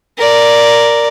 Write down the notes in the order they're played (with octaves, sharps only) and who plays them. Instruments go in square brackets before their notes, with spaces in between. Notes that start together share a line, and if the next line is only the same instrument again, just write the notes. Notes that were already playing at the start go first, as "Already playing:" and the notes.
[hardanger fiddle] A#4 D5